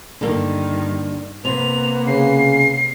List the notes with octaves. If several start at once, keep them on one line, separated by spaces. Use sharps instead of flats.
G2 D3 D#3 A#3
C3 A#3 B3 F7
C#3 C7